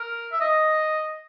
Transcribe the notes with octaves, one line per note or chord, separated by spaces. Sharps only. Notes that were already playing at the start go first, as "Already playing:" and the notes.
Already playing: A#4
E5
D#5